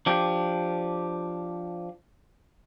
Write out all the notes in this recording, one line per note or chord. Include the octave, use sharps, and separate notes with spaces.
F3 D4 G4